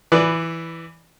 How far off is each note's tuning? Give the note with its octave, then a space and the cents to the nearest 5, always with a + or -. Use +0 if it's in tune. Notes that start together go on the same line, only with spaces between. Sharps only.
E3 +0 B4 +0 D5 +0